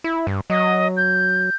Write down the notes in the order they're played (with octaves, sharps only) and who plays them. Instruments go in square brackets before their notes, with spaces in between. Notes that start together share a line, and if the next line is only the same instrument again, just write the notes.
[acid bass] E4
G2
[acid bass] F#3 [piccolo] D#5
[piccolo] G6